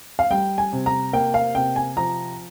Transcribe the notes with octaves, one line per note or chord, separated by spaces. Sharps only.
F5
G3 G5
G#5
C3
A#5
A#3 G5
F5
C3 G5
G#5
F3 A#5